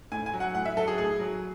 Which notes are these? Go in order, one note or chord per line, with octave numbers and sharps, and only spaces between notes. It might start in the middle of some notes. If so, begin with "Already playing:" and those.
A2 G#5
G#5
F#3
F#5
A2 F#5
E5
F#3 A4
G#4
A2 G#4
F#3